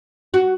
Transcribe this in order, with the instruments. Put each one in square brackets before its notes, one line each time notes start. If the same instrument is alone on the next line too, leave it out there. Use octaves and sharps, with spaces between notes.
[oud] F#4